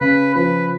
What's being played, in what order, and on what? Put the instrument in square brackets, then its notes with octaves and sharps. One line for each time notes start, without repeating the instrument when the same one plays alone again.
[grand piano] C#3 [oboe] B4
[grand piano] F3 [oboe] B4